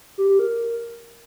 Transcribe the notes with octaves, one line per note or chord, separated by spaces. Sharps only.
G4
G4
A#4